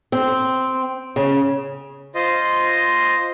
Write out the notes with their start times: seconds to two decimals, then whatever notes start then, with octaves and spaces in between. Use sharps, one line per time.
0.12 C4
1.16 C#3
2.15 F4 C5 D#5